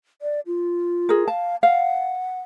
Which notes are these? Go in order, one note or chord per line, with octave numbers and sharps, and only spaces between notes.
D5
F4
G#4 A#4
F5 A5
F5 F#5